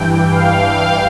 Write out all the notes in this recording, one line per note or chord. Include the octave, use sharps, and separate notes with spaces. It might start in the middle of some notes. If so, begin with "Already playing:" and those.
Already playing: G2 E3 G5
F5